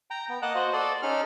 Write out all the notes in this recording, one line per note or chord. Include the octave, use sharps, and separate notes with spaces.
G5 A#5
B3
A#3 D#5 F#5 A5 F#6
F#4 C5 D#5
A4 D5 C6
C#4 D#4 G#4 A4 F6